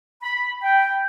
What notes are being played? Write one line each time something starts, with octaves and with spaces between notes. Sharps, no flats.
B5
G5